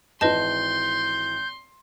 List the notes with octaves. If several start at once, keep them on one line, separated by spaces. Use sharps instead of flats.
G#1 E3 B4 D#5 A5 C6 G6